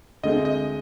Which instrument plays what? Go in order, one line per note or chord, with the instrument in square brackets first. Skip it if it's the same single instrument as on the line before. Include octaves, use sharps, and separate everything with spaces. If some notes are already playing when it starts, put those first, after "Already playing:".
[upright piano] D2 D3 G#3 C4 [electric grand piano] D#5
[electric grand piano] D#5